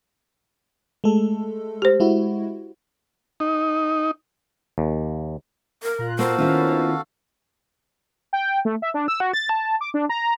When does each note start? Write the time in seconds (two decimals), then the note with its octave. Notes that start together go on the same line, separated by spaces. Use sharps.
1.04 G#3 A3 A4
1.82 G4 C5
2.00 G#3 E4 F#4
3.40 D#4
4.78 D#2
5.83 A#4
5.99 A#2 F4 A#5 F#6
6.19 A#3 F#4 A4 C5 F5
6.38 D#3 A#3 B3 C#4 E4 F4
8.33 G5
8.65 A3
8.82 E5
8.94 D4
9.08 E6
9.20 F#4
9.33 A6
9.49 A5
9.81 D6
9.94 D4
10.09 A#5